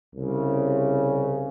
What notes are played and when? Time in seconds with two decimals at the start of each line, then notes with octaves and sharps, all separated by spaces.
0.14 C2 C#3